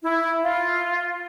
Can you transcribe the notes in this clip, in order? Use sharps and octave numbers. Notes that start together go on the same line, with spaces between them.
E4
F4